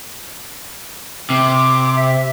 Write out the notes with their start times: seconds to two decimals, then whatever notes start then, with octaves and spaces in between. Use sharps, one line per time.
1.30 C3 D6
1.96 E5